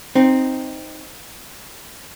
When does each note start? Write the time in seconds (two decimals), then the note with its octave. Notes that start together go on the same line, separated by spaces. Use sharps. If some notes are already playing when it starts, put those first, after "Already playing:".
0.15 C4 D#4